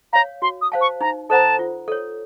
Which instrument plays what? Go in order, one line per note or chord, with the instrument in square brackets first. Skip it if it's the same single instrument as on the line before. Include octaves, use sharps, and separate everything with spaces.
[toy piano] C#5 F5 [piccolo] A#5
[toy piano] F#4 [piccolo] C6
[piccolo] D#6
[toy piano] C5 F5 A5
[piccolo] C#6
[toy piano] D#4 [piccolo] A#5
[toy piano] A4 C5 F#5 A#5 [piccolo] A5
[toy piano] F4
A4 C#5